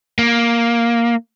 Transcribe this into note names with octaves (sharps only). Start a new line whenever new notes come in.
A#3